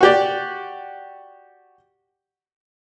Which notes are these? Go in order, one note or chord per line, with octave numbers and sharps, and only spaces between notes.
F#4 G4 D5